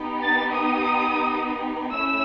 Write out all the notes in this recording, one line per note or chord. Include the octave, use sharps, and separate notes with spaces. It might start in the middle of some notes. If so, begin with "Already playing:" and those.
Already playing: B3 D#4 G4
A6
D#6
A3 C#4 E4 E6